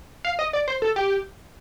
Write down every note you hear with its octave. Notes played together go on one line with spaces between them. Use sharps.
F5
D#5
D5
C5
A4
G4